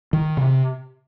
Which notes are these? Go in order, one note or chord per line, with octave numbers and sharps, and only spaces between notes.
D#3
C3